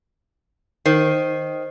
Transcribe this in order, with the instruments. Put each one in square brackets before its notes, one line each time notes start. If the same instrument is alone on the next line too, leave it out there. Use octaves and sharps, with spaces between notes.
[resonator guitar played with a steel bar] D#3 [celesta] C5 C7